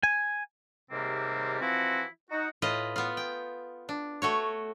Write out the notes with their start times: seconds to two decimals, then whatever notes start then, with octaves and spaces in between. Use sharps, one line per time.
0.03 G#5
0.91 D#2 G#2 C3 G3 A#3 C4
1.61 E3 F3 C4 E4 F#4
2.31 D#4 F#4
2.62 A2 F4 B4 D#5
2.96 B3 F4
3.17 G5
3.89 D4
4.22 A3 F#4 C#5